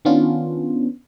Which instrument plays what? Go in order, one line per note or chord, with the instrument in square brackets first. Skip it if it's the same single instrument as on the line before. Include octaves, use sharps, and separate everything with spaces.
[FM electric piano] D#3 B3 C#4 D4 F4